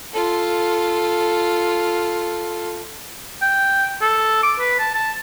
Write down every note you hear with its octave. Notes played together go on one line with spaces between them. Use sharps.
F4 A4
G5
A4
D6
B4
A5
A5